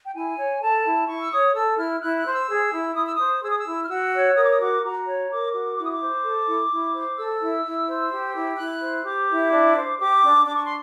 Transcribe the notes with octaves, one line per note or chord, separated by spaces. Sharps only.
G5
E4 G#5
C#5
A4 A5
E4
E4 C#6
E6
C#5 D#6
A4 E6
E4 F6
E4 F#6
F#6
C5
E6
G#4
E4
E4 D#6
E6
C5 D#6
G#4 E6
D#6
E6
E4
F6
F#4 E6
C#5
A#4 D#6
D6
D#6
F#4 D6
F#4 A#5
C#5
A#4 D6
F#4 D6
E4 D6
D#6
D6
C5
A4
E4
E4
C5
A4 E6
E4
E4
C5
G4
E4
E4 F#6
C5
G4 D6
E4
D4
C5
G4 D6
D4
D4 D6
C#6
C6